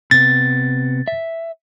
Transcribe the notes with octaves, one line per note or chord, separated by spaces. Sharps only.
C3 B3 A6
E5